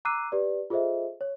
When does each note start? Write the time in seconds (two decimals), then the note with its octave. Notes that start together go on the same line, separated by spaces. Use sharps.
0.05 A#5 D6 E6 F#6 C7 D#7
0.32 G4 B4 D5
0.70 F4 G#4 A4 C5 D#5 E5
1.21 C#5